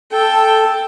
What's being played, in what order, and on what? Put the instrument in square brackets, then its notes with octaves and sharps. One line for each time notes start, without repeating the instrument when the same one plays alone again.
[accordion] A4 [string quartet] G5 A5